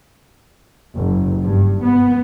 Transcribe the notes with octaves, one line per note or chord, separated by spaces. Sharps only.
F#1
G2
B3